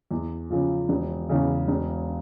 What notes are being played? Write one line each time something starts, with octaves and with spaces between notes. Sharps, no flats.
E2
C#3 F3
E1
E2 C#3
E1